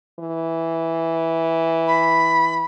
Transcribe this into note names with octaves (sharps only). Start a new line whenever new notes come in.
E3
B5